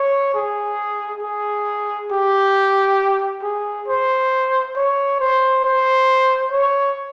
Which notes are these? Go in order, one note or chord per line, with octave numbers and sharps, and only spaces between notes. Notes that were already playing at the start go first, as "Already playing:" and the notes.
Already playing: C#5
G#4
G#4
G4
G#4
C5
C#5
C5
C5
C#5